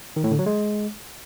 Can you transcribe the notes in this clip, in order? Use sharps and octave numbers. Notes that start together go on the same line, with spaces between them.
D#3
A2
D3
F#3
G#3